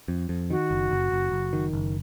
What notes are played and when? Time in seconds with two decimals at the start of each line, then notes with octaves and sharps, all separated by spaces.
0.08 F2
0.29 F2
0.50 D#3 F#4
0.71 F#1
0.91 F#1
1.12 F#1
1.32 F#1
1.53 D#3
1.73 F#1